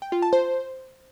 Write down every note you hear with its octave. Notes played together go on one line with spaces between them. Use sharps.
G5
F4
A5
C5